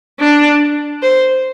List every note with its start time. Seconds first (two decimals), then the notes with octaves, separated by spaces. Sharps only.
0.20 D4
1.02 C5